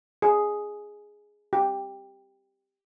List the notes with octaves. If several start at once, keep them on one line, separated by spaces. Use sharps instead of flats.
G#4
G4